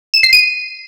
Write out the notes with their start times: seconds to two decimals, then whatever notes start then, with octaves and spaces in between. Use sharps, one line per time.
0.14 E7
0.23 C7
0.33 D#7